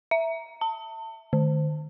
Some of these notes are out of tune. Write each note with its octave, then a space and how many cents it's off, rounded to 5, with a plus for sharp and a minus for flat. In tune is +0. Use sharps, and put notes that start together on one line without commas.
E5 +0
A5 +35
D#3 -40